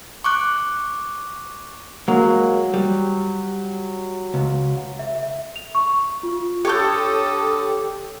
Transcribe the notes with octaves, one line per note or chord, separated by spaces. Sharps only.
C#6 D6 F#6
F#3 G#3 A#3
G3
C#2
E5
E5
F7
C#6
F4
D3 G4 A4 C#5 C#6 D#6 G6